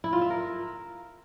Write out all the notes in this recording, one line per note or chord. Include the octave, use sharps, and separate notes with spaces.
E4
F4
E5
A#4